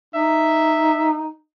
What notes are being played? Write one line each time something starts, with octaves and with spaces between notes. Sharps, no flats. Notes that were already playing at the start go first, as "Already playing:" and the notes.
D#4 E5